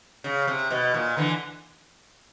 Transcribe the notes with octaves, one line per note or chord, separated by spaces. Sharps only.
C#3
C3
B2
A#2
D3 E3